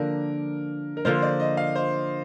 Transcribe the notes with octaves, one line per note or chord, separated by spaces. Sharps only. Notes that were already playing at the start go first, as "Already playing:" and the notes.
Already playing: D3 F3 A#3 D4 A#4
A#4
D3 F3 A#3 F4 C5
D5
D#5
F5
C5